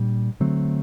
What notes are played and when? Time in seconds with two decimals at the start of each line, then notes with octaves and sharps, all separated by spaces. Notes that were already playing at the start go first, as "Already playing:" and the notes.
Already playing: A#2 G3 D4
0.40 D3 F#3 A3 C4